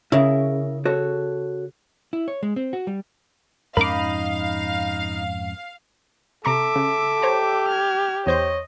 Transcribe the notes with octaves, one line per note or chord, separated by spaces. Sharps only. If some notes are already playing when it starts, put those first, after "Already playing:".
C#3 E4 A#4 E5
F#4 A4 C#5
E4
C#5
G#3
C4
F#4
G3
F2 G#2 C#4 D#4 A#4 F5 B5 D6
C3 A4 E5 A#5 C#6 D6
C#3
G4 C5 C#5 A#5
F6 G#6
E2 C5 C#5 D#5 G6